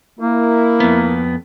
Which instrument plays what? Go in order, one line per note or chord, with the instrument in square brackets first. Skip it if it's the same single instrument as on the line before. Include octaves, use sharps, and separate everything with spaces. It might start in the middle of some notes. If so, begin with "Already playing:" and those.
[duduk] A#3 [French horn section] E4 A#4
[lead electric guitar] F2 B3